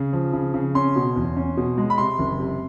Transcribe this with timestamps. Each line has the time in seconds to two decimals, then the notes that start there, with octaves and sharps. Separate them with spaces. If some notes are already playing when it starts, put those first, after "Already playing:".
Already playing: C#3
0.13 F3
0.33 C#3
0.54 C#3
0.75 C#4 C6
0.96 B2
1.16 E2
1.37 C#4
1.57 B2
1.78 G#3
1.90 B5
1.98 C3 C6
2.19 F#1
2.39 C3